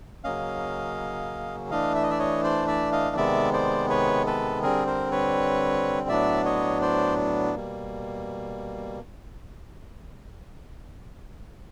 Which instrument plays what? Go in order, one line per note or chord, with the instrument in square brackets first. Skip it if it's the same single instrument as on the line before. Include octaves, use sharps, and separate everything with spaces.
[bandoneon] C#3 F#3 A#3 C#4 D#5 F5
E3 A3 D4 D#5 F5
E5
D#5
D5 E5
C#5 D#5
C5 D5
D5 E5
D#5 F5
C3 D#3 G#3 B3 D5 E5
C5 D5
B4 C#5
A4 B4
D3 G3 C4 G#4 A#4
A#4 C5
B4 C#5
A2 F#3 B3 D4 D5 E5
C#5 D#5
C5 D5
B2 G3 A#3